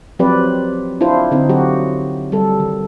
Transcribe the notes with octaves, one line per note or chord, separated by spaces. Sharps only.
F3 F#3 C4 G4 B4 D5
D4 E4 F4 C5
D3 C4 D#4
F#3 F#4 G4
G3 A4
D#3